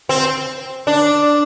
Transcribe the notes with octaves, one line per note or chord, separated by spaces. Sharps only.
C4
D4